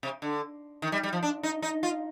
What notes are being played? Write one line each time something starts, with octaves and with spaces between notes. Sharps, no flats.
C3
D3
D#3
G3
G3
F3
D4
D#4
D#4
F4